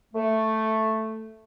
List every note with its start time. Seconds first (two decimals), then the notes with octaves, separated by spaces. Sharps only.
0.14 A3